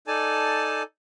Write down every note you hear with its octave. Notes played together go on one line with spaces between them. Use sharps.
D#4 A4 D5 G#5 A5